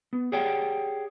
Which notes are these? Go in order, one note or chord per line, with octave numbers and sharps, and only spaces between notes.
B3
G4 G#4 C#5 D5 F#5 G5